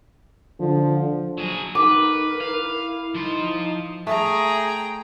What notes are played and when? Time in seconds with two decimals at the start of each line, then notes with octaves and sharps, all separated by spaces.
0.60 D3 F3
1.38 F#3 G#4
1.75 D#4 A#4 B4 D6
2.41 E4 F5
3.15 F3 D#4 C6
4.07 A3 G#4 G5 A#5